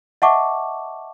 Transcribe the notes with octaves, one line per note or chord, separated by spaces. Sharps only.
D#5 E5 F#5 A5 C#6 D6